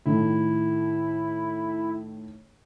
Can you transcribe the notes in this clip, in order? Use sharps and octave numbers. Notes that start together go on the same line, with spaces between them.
A2 D#3 A3 E4